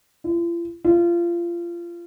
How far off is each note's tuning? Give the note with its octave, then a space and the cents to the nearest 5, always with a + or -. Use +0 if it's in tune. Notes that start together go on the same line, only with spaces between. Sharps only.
F4 -45
F4 -25